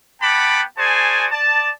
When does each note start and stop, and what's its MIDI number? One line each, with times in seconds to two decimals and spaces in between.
0.22 0.62 59
0.22 0.62 78
0.22 0.62 79
0.22 0.62 81
0.22 0.62 83
0.22 0.62 86
0.78 1.26 66
0.78 1.26 68
0.78 1.26 72
0.78 1.26 74
0.78 1.26 80
0.78 1.26 81
1.31 1.71 74
1.31 1.71 81